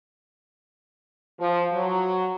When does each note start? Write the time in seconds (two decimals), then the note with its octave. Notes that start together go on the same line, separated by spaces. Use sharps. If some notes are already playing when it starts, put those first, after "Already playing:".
1.40 F3
1.72 F#3